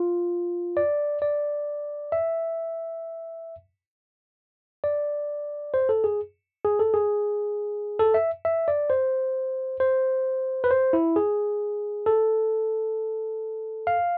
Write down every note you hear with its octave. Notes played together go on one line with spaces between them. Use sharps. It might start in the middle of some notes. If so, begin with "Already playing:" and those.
Already playing: F4
D5
D5
E5
D5
C5
A4
G#4
G#4
A4
G#4
A4
E5
E5
D5
C5
C5
B4
C5
E4
G#4
A4
F5